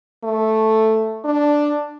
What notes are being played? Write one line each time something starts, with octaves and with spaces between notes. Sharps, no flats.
A3
D4